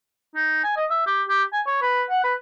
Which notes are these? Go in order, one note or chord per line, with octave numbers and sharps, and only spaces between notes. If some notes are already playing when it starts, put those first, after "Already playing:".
D#4
G#5
D#5
E5
G4
G4
G#5
C#5
B4
F#5
B4